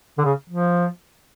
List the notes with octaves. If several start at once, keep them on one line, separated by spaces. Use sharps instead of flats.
D3
C#3
F3